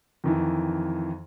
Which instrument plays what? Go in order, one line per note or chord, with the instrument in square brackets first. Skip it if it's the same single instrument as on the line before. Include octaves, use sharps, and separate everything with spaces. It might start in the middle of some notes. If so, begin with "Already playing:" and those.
[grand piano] F2 D#3 E3